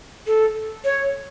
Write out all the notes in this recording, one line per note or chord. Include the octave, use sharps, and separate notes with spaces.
A4
C#5